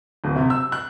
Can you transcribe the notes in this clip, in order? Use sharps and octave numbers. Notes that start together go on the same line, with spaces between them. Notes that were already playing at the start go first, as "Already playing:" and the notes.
D1
C3
E6
F#6